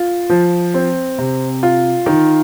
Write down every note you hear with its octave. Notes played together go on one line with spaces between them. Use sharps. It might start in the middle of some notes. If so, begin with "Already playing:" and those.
Already playing: F4
F3
C4
C3
F4
D#3